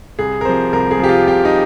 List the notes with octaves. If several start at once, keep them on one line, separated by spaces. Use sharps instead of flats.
C2 G#4
A#4
C3 F3 C5
C2 A#4
G#4
C3 F3 G4
F4
C2 G4
D#4